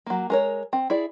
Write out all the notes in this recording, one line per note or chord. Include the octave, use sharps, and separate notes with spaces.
F#3 A#3
G#3 A#4 C#5
C4
E4 G#4 D5